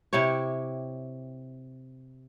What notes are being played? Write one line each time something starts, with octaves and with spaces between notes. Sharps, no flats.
C3 E4 G4 C#5